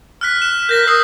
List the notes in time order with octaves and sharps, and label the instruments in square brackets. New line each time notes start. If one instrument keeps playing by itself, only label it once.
[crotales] F6 F#6 B6
E7
[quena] A#4 [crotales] G6 A#6 B6
[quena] D#6 [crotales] E6 C7 F#7